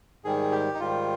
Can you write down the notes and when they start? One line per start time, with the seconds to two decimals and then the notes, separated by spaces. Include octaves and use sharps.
0.24 G#2 D#3 G3 G#4
0.52 G4
0.74 D#4
0.80 G#2 D#3 G3 F4